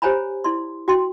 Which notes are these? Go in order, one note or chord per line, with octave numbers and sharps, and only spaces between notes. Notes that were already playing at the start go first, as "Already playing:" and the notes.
G4 C5 C#5 G#5 A#5 B5
E4 D5 C6
F#4 G5 C6